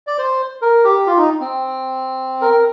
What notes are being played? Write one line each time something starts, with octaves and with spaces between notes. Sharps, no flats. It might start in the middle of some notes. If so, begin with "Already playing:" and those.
D5
C5
A#4
G4
F4
D#4
C4
A#4